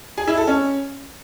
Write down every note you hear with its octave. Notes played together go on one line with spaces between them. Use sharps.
G#4
E4
A4
C#4